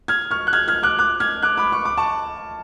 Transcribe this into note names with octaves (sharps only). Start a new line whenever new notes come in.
F6 G#6
C#6 F6
F#6
F6 G#6
F6 G#6
D6 F#6
D6 F#6
F6 G#6
D6 F#6
B5 D6
C#6
D6
A5 C#6